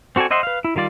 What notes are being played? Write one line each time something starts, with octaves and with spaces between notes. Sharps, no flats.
C4 F#4 A4 D5 G#5
C5 D#5 E5 F#5 C6
B4 F5
E4
D#3 G3 F4 D5